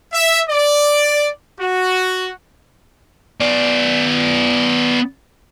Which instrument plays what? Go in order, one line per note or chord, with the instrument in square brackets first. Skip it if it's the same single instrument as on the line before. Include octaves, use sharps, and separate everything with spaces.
[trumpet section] E5
D5
F#4
[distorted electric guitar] B3 D5